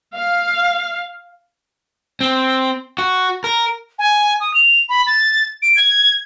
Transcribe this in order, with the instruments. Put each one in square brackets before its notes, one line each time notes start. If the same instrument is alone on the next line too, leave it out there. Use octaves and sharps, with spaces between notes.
[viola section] F5
[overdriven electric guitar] C4
F#4
A#4
[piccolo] G#5
D#6
F7
B5
A6
D7
G#6